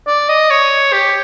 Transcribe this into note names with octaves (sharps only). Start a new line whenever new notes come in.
D5
D#5
C#5
G4